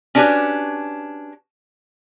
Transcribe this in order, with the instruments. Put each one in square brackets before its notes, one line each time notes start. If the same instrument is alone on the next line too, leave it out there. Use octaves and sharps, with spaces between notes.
[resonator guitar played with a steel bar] C#4 D4 F#4 G4 B4 C#5